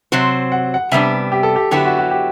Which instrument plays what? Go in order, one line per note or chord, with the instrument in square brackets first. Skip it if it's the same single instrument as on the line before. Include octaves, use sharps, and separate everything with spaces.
[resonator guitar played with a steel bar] C3 F#3 C4 F#4 C5
[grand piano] F#5
F#5
[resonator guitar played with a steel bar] C3 G3 B3 D4 [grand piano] E5
[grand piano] G4
A4
G4
[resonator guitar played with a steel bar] D3 F#3 B3 E4 [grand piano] G4
[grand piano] F#4
F#4
G4